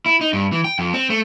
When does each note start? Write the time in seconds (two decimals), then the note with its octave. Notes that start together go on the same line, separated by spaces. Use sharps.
0.06 E4
0.21 D#4
0.33 G2
0.52 E3
0.65 G5
0.79 F2
0.94 C4
1.10 A3